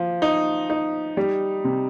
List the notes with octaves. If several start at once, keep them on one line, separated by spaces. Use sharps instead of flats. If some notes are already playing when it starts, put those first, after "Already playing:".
Already playing: F3
D#4
D#4
G3
C3